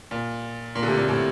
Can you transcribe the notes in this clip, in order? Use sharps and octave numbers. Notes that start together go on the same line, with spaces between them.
A#2
A#2
D3
A2 C3
A#2 D3
A2 C3